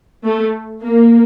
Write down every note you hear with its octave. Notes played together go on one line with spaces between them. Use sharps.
A3
A#3